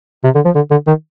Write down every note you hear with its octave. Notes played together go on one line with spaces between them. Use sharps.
C3
D3
F3
D3
D3
D#3